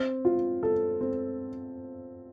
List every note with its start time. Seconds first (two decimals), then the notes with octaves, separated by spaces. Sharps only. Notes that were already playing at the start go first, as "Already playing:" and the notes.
Already playing: C4
0.25 F4
0.63 A4
1.01 C4